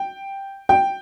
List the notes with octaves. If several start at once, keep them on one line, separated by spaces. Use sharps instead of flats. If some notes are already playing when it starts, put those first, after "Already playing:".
Already playing: G5
G5